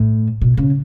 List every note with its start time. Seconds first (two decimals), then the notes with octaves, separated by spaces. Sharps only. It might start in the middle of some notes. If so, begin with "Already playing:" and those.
Already playing: A2
0.41 B2
0.57 C#3